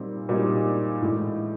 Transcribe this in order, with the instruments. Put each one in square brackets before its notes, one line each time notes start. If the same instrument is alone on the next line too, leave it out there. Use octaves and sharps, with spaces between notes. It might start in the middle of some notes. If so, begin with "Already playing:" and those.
Already playing: [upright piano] A#2 G3 C4 D#4
A#2 G3 C4 D#4
A2 E3 G#3